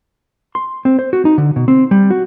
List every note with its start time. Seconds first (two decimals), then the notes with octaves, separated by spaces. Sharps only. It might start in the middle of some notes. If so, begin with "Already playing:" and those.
0.55 C6
0.85 C4
0.99 C5
1.13 F#4
1.25 D#4
1.38 D3
1.56 B2
1.68 C4
1.91 G3
2.10 F#4